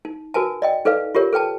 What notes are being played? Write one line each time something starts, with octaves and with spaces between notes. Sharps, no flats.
D#4
F#4 A#4 B4 G#5 A5
D5 D#5 G5
D#4 A4 B4 D5 F5
F4 G4 A#4 C#5
A4 B4 G5 A5